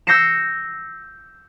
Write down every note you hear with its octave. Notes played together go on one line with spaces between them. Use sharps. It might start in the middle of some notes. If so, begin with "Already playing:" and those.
E6 G6 A#6 C7 C#7 E7